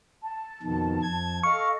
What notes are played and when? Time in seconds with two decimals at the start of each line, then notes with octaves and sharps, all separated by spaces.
0.22 A5
0.63 F2 B2 D#3
1.02 F2 G#6
1.43 A4 D#5 F5 C#6